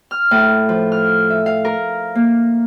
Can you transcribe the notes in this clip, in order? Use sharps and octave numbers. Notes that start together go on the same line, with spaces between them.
F6
A2
F3
F6
E5
F5
A#4
A#3